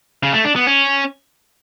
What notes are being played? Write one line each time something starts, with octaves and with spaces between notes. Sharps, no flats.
C#3
A3
D4
B3
C#4